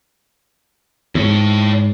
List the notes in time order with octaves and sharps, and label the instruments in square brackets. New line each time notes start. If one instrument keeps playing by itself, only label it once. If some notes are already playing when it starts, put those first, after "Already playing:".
[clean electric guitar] E2 G#2 [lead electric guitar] E4 C#5